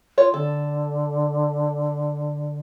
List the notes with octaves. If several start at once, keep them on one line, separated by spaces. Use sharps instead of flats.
F4 C#5
D3 A4